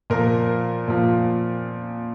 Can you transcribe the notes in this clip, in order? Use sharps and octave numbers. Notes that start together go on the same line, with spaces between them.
A#2 F3 A#4
A#2 F3